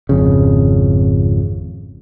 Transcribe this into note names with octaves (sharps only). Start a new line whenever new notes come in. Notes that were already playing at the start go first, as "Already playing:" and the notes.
G#1 F2 C#3